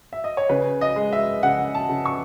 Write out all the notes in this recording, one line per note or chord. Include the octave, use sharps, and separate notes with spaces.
E5
D#5
C#5
C#3 B4
D#5
G#3
E5
C#3 F#5
A5
C#3
C#6